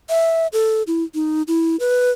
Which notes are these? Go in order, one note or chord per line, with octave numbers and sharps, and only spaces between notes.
E5
A4
E4
D#4
E4
B4